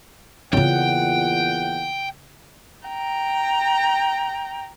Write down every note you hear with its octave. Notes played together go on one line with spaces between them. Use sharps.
E2 A#2 C#3 D#4 F4 F#5 G5
G5 A#5